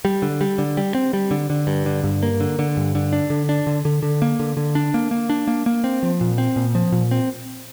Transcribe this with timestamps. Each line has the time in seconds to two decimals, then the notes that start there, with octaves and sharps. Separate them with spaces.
0.05 G3
0.22 D3
0.41 G3
0.58 D3
0.77 G3
0.95 C4
1.13 G3
1.31 D3
1.50 D3
1.67 G2
1.86 D3
2.04 G2
2.23 A#3
2.40 D3
2.59 D3
2.77 G2
2.95 D3
3.13 D4
3.30 D3
3.49 D4
3.67 D3
3.85 D3
4.02 D3
4.22 A#3
4.40 D3
4.57 D3
4.75 D4
4.94 A#3
5.11 A#3
5.30 D4
5.48 A#3
5.66 A#3
5.84 C4
6.03 F3
6.21 A#2
6.38 C4
6.56 A#2
6.75 F3
6.92 A#2
7.11 C4